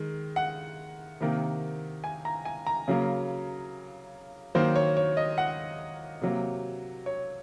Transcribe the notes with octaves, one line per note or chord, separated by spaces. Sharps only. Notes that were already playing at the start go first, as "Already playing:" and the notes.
Already playing: D#3 G#3
F#5
C3 D#3 A#3
G#5
A#5
G#5
A#5
C#3 F#3 A#3
D#3 F#3 A#3 C5
C#5
C#5
D#5
F#5
C3 F#3 A#3
C#5